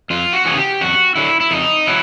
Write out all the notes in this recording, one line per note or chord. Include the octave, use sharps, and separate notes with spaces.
F2 F4
F#4
C#3 E3 G#4
G4
F2 F#4
D3 F#3 E4
E4
F2 D#4
F#3 E4